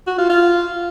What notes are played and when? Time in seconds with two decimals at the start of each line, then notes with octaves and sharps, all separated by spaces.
0.07 F#4
0.18 F4
0.30 F4